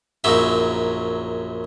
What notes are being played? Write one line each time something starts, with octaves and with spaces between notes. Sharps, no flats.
A#1 F#2 F#3 D#4 E5